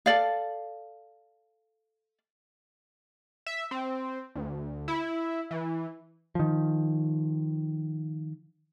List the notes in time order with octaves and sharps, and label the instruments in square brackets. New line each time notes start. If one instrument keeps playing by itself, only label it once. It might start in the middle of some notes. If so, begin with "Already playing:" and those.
[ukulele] A4 D5 F5
[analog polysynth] E5
C4
D2
E4
E3
[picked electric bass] D#3 F3